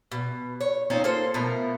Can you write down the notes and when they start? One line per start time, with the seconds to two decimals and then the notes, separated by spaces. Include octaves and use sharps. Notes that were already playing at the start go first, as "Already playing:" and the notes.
0.12 B2
0.61 C#5
0.90 C4 C#4 D#4 F4
1.04 A#3 F4 A4 C5
1.34 B2 F3 A3 A#4